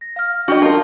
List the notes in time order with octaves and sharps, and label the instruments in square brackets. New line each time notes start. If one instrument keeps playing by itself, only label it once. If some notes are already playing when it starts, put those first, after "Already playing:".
[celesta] A#6
F5 F6
[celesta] D4 [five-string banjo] F#4 G4 D#5
[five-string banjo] F4 A#4 [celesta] A5